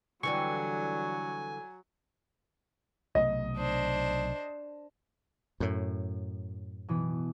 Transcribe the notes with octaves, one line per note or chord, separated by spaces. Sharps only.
D3 E3 F#3 G3 G#5 C#6
B1 C3 A3 D#5
D4 C5
F#2 A2
B2 E3